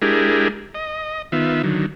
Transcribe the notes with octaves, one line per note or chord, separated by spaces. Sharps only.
G#3 D4 E4 G4 G#4 A#4
D#5
D#3 B3 F4 E5
D3 D#3 F#3